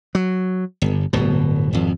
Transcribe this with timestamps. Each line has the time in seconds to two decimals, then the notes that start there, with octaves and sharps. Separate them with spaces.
0.15 F#3
0.82 G1
1.13 D1 G1 B2
1.73 G#1 F2